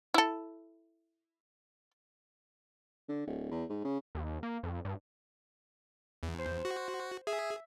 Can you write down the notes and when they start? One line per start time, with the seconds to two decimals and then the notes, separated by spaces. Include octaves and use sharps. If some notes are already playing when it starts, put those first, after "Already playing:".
0.14 E4 A4
3.09 D3
3.27 D1
3.51 E2
3.69 G#2
3.85 C#3
4.15 D#2
4.43 A#3
4.63 F2
4.85 G2
6.23 E2
6.39 C5
6.65 F#4
7.27 G#4 E5